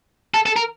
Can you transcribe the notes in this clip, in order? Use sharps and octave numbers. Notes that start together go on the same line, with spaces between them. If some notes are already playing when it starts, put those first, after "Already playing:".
A4
A4
A#4